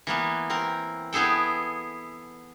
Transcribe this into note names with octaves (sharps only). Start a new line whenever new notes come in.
E3 A#3 B3
C4 A#4
B3 E4 G#4 A4 G5